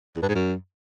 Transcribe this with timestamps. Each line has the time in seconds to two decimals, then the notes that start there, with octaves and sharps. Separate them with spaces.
0.16 E2
0.23 G2
0.29 G#2
0.35 F#2